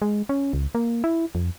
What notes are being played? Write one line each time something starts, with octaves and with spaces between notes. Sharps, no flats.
G#3
C#4
C#2
A#3
E4
F2